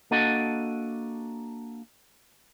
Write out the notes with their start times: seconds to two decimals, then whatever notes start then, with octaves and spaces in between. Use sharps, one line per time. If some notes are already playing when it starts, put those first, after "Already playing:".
0.11 A#3 D4 F#4 A4 D#5 F#5